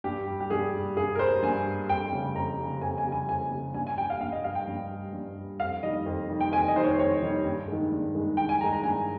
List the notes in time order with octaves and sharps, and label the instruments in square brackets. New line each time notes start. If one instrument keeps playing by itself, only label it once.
[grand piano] G2 G4
G3
G4
G2 G#4
G3
G2 G#4
A#4
G3 C5
G2 G#5
G3
F2 G5
C#3 G3
F2 A#5
C#3 G3
F2 G#5
G#5
C#3 G3
G#5
F2 G#5
C#3 G3
G2 G#5
G#5
G3 G5
F5
G2 F5
D#5
G3 F5
G5
G2
G3
G2
G3
F2 F5
D#3 G3 D#5
F2
D#3 G3
G5
F2 G#5
D#5
D#3 C5
G3 C#5
C5
F2 C#5
D#3 G3
G2
D#3 G#3
G2
D#3 G#3
G2 G5
G#5
D#3 G#3 A#5
A#5
G2 G#5